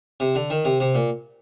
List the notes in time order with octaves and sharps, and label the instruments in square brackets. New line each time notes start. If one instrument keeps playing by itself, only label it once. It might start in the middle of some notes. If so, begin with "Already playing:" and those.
[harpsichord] C3
D3
D#3
C3
C3
A#2